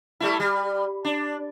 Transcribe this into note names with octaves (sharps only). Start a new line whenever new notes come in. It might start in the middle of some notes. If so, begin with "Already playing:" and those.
G3 A3 E4
G3
D4